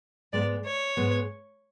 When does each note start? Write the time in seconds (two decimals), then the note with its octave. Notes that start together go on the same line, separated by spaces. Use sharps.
0.33 G#2 G#3 B3 D5
0.65 C#5
0.97 G#2 G#3 B3